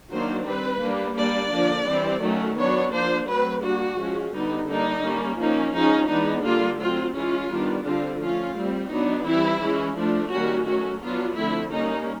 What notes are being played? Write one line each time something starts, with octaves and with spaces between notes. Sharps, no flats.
D#3 F#3 A#3 D4 C5
G3 C4 B4
G3 A#3 D4
G3 A#3 D4 D5
D3 F3 A#3 D4
E3 G3 C4
D#3 F#3 A3 C#4
F#3 B3 D4 C#5
F3 A#3 D4 C5
F#3 A3 C4 B4
G3 A#3 D4 F#4
F3 G#3 C#4
D3 G3 B3 D#4
D3 G3 A#3 D4 D#4
G3 A#3 C#4
F3 A#3 C#4 D#4
F3 G#3 C#4 D#4
E3 G#3 B3 D4 D#4
D3 G3 A#3 F4
F#3 A3 C4 F4
E3 G#3 C#4 F4
D#3 G3 B3 D4
D3 G3 C4 F4
F3 A3 C#4 F4
G3 C4
F#3 B3 D4 D#4
E3 G3 C4 E4
E3 G#3 C#4
F3 A3 D4
D#3 G3 A#3 C#4 F#4
F#3 A3 C#4 F#4
F#3 B3 D4 F4
D3 F3 A3 C4 E4
G3 A#3 C#4 D#4